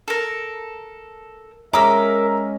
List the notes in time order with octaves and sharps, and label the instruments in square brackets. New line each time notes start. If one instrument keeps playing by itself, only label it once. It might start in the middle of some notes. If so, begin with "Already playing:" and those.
[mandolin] A4 A#4
[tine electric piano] G#3 C#4 D#5 [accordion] A#4 E5 [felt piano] A#5 [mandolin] D6 E6